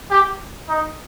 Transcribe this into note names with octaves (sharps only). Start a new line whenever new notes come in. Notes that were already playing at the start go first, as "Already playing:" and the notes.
G4
D#4